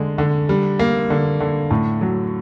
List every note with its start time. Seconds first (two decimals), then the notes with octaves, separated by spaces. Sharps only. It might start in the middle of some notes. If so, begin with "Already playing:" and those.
Already playing: D3 G#3
0.18 D3
0.49 G3
0.79 A#3
1.10 D3
1.40 D3
1.71 A2
2.01 F#3